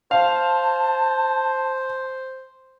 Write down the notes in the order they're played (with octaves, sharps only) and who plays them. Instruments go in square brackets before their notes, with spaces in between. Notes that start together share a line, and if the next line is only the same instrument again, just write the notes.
[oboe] C5 [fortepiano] F5 [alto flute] A5